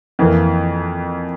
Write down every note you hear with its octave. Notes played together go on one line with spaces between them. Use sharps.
F2 E3 A#3